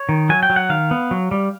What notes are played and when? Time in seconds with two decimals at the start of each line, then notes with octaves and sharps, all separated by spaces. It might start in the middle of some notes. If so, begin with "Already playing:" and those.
Already playing: C#5
0.09 D#3
0.29 F#3 G#5
0.43 G5
0.50 F#3
0.56 F#5
0.69 D#3 F5
0.91 B3
1.11 F#3
1.31 G3